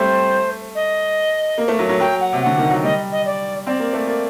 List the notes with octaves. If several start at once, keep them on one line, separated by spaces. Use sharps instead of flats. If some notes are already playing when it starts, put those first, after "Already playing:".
Already playing: G3 A3 C4 C5
D#5
A#3
A3
F#3
F#3
F#3 G5
F#5
C3
D3 F#5
D#3
F#3
G3 D#5
D#5
D5
C4 D5
A#3
A3
A#3